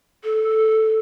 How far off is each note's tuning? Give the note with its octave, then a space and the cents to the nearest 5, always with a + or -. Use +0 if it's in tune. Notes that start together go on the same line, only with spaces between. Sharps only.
A4 -5